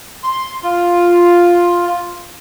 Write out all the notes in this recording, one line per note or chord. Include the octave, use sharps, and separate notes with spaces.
C6
F4